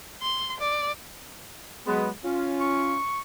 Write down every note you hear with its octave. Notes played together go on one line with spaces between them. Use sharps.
C6
D5
F#3 G#3 B3
C#4 F4
C#6